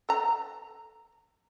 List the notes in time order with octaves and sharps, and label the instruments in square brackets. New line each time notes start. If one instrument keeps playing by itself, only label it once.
[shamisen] A4 A#5